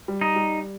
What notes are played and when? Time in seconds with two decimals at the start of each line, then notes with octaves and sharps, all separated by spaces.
0.08 G3
0.21 D#4
0.36 G3